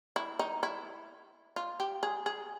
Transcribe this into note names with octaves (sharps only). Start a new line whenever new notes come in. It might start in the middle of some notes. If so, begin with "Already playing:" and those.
E4
D#4
E4
F4
G4
G#4
G#4